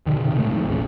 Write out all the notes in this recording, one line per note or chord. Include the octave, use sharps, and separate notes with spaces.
B2 D3 D#3
A2 C3 D#3
A#2 C#3 G#3 A3
F2 A2 D#3
A#1 E2 A#2 C#3